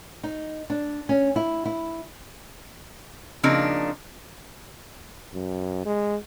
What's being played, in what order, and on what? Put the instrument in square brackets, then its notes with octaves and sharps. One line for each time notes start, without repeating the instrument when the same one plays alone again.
[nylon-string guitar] D#4
D4
C#4
E4
E4
[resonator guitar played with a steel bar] C#3 F3 A#3 C4 D4 D#4
[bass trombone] F#2
G#3